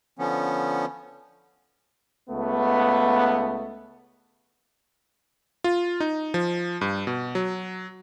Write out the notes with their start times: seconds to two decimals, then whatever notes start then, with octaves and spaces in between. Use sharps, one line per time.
0.19 D3 F3 B3 C#4
2.30 C#2 A3 B3
5.64 F4
6.00 D#4
6.34 F3
6.81 G2
7.07 B2
7.35 F#3